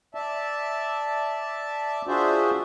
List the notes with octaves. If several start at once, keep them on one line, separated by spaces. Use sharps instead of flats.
D5 E5 A5
D4 F4 F#4 G#4 C5 E5